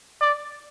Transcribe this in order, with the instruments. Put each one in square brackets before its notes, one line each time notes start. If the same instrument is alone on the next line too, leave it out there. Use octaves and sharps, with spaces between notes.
[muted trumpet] D5